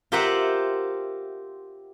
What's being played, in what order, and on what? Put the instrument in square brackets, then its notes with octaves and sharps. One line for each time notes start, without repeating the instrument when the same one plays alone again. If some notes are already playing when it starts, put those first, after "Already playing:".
[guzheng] F4 G4 A#4 C5 E5 F#5